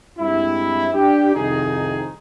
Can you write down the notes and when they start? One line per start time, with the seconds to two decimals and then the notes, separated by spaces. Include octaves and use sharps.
0.19 G2 G#3 C4 E4
0.94 D4 G4
1.35 C2 F2 C3 D#3 D#4 G#4